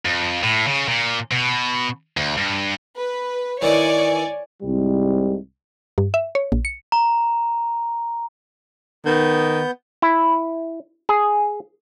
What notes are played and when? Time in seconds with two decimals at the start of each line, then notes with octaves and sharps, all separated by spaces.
0.05 F2
0.43 A2
0.67 C#3
0.88 A#2
1.31 B2
2.17 D2
2.37 G2
2.96 B4
3.62 D#3 E3 C#5 D5 G#5
4.63 C2 G#2 G3
5.98 G2
6.14 E5
6.35 C#5
6.52 A#1
6.65 C#7
6.92 A#5
9.06 D#3 B3 G6
10.02 E4
11.09 G#4